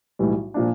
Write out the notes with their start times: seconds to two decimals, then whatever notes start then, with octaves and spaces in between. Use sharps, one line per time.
0.19 B1 A2 E3 G3
0.54 A#2 F3 A#3 D4